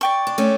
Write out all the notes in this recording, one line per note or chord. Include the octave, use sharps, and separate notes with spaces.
D5 G5 C#6
D4
A3 C#4